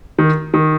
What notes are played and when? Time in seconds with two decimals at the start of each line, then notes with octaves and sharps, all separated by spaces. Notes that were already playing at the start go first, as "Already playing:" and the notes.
0.18 D#3
0.54 D#3